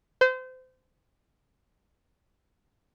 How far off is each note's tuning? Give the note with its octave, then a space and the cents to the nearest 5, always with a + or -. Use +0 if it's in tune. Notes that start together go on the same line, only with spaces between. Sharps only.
C5 -30